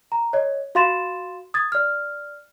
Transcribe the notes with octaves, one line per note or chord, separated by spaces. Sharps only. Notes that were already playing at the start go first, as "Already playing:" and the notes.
A#5
C#5 D#5
F#4 F5 C6 A6 E7
D#6 G#6 A6
D5 F6